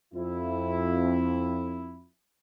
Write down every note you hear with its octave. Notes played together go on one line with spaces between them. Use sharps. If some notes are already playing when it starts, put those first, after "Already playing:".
F2 E4